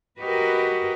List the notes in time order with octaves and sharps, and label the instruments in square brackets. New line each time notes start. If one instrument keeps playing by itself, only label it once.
[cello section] F#4 G4 A#4 B4 D#5